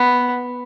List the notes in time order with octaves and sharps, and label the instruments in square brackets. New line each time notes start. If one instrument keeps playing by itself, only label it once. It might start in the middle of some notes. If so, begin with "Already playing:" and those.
Already playing: [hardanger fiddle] B3